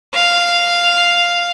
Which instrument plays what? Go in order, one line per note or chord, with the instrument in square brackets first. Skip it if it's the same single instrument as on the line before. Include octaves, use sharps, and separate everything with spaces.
[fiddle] F5